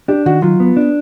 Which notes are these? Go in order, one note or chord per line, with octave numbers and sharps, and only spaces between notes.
D4 G4
D#3 F#4
F#3 F4
B3
D4